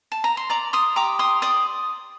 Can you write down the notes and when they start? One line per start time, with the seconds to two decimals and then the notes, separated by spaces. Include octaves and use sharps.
0.12 A5
0.24 A#5
0.37 C6
0.50 D5 A#5 D6
0.73 C6 D#6
0.96 G4 A#5 D6
1.19 C6 D#6
1.42 D5 C6 D#6